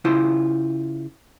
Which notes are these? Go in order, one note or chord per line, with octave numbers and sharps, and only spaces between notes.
C#3 E4 F4 C5